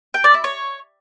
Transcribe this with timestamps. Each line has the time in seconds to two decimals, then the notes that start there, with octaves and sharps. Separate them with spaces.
0.14 G5
0.24 D5
0.34 E4
0.44 C#5